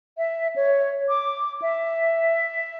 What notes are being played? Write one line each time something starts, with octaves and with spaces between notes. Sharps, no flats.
E5
C#5
D6
E5